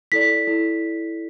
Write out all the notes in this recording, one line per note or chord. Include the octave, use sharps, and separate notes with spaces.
E4 A4 D5 B6
E4 A4 D5